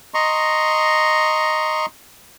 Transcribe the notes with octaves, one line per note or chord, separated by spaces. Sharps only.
D#5 A#5 C6 C#6